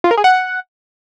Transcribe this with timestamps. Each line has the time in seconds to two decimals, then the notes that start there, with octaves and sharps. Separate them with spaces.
0.04 F4
0.11 A#4
0.17 G#4
0.24 F#5